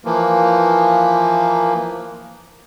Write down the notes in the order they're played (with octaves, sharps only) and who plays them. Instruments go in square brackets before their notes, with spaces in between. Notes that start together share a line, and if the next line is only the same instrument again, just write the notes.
[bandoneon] E3 F3 A#3